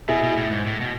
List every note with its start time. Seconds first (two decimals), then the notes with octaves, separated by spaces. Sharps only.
0.08 B2 E4 G#4
0.23 B2
0.37 A2
0.51 G#2
0.67 A2
0.81 B2